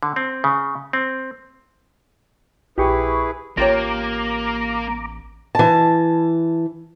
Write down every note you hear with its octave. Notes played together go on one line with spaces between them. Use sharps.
D3
C4
C#3
C4
A#1 E4 G4 G#4 B4 C#6
A1 A#3 F4 G4 C#5 A#5 D6
E3 A5